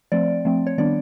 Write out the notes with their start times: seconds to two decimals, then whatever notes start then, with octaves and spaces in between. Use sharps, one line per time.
0.12 F3 A3 C4 D5
0.45 F3 A3 C4
0.67 C#5
0.78 D#3 G3 B3 D4 D5